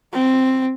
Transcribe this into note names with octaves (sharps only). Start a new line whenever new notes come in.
C4